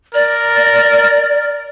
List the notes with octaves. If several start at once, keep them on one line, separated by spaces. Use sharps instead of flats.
A#4 D5